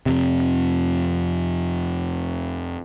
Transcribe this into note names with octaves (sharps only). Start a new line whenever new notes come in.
F2 C3